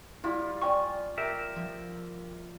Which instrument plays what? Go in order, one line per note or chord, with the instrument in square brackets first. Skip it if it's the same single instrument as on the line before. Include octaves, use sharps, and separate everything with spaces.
[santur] G3 F4 [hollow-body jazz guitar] E4
[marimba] D5 G5 C#6 [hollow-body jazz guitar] G#5
[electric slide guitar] G4 A#4 E5
[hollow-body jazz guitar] F3